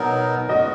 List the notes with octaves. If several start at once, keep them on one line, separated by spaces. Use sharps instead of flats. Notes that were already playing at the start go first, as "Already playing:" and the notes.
Already playing: B2 F#3 B3 D#4 A#4
G#3 B3 F#4 D#5